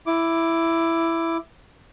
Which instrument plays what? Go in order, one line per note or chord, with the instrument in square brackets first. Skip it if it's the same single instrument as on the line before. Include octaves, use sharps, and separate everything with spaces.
[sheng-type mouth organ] E4 D6